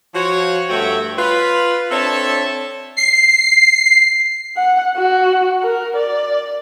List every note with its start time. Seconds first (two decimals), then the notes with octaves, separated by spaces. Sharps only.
0.15 F3 F#4 C#5
0.69 G2 A3 F#4 C#5 E5 G5
1.17 F4 B4
1.91 C4 D4 A4 C#5 E5 A5
2.97 C7
4.57 F#5
4.97 F#4
5.63 A#4
5.96 D5